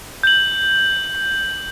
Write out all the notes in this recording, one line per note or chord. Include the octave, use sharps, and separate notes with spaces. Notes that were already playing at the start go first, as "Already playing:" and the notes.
G6 F#7